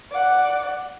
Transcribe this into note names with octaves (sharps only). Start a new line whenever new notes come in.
D5 F#5